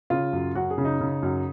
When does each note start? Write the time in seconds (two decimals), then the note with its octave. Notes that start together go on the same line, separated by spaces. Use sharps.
0.10 C#3 F4
0.33 F#2
0.55 F#2 F#4
0.70 G#4
0.78 C#3
0.85 D#4
1.01 C#3
1.23 F#2